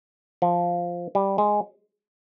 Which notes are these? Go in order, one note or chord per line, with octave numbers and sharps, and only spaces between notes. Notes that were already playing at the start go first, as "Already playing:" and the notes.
F3
G3
G#3